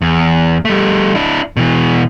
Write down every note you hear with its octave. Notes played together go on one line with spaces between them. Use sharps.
E2
G3 A3
D4 E4
B2 E3